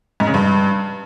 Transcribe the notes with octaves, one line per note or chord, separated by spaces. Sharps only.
G#2
C#3
G2